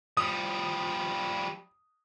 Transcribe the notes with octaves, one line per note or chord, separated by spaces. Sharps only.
F3 G3 D#6